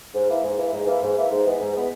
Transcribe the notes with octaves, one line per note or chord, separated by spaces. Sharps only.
G#2
E3 A#3 E4
G#2
E3 A#3 E4
G#2
E3 A#3 E4
G#2
E3 A#3 E4
G#2
E3 G#3 B3
G#2
E3 G#3 B3